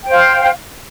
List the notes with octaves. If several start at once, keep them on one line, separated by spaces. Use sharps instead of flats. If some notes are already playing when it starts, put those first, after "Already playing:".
C5 F5 G5